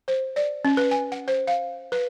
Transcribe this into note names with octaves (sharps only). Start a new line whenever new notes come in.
C5
D5
C#4
B4
G#5
F#5
C5
F5
B4